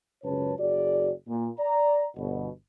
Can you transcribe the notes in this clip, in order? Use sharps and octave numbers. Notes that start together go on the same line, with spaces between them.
C#2 F#2 C#3 B4 C#5 A5
F#1 F#4 G#4 D5
A#2
D5 A#5
G1 B2